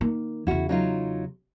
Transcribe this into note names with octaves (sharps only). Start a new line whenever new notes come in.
D#3 A#3
E2 C#3 E4 F#4
F#3 D#4 F4